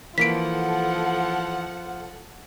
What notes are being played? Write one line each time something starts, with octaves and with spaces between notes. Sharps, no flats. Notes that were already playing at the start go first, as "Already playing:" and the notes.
E3 F3 A#3 A4 F#5 B6 D7